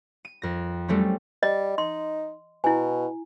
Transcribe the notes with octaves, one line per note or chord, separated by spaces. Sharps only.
D#7
F2 A#6
F#3 G3 A3 C4 C#4
G3 D#5
D#4 C6
B2 E4 G#5